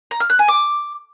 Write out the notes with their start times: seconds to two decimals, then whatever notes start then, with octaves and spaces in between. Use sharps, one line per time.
0.11 A#5
0.20 F6
0.30 F#6
0.39 G#5
0.48 D6